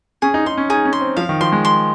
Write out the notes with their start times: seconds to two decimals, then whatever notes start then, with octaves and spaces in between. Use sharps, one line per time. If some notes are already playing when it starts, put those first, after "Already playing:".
0.22 C#4 G#4
0.34 D#4
0.46 D#4 C6
0.58 C#4
0.69 D#4 G#4
0.85 C#4
0.93 C6
1.01 C4
1.17 F3 F5
1.29 D#3
1.40 F3 C6
1.52 G#3
1.65 C6